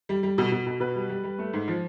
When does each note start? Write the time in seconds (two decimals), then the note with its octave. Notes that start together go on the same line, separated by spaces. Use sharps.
0.09 G3
0.23 G3
0.38 B2
0.52 B2
0.66 B2
0.80 B2 B4
0.95 G3
1.09 G3
1.24 G3
1.38 A3
1.53 G#2
1.68 F3